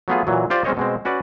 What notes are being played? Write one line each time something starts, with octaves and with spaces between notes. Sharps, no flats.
F#3 A3 B3 F4 G#4
A#2 E3 F#3
F4 G4 C5 D5
G#3 C4 C#4 C5 C#5 D#5
B2 G#3 C4
C#4 F#4 B4 D5